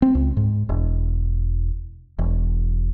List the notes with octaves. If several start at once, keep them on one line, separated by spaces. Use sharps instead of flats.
C4
C#2
G#2
E1
E1